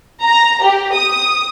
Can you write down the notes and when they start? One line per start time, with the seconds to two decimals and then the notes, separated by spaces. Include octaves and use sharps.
0.22 A#5
0.63 G4
0.94 D#6